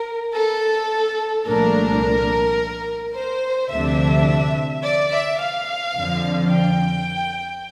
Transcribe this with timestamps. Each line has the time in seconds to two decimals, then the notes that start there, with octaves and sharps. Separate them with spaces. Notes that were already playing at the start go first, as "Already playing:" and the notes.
Already playing: A#4
0.34 A4
1.46 C2 A#2 F3 A3 D4 A#4
3.15 C5
3.71 D2 C3 F3 A3 D4 E5
4.83 D5
5.12 E5
5.39 F5
5.96 F2 D3 F3
6.51 G5